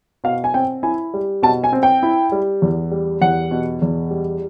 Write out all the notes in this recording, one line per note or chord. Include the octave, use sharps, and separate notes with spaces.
B2 F5
G#5
C4 G5
E4 G#5
G3
B2 A5
G#5
C4
G5
E4
G3
E2
G3
E2 F#5
B2
E2
G3